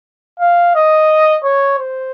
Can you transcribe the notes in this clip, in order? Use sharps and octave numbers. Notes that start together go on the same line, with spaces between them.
F5
D#5
C#5
C5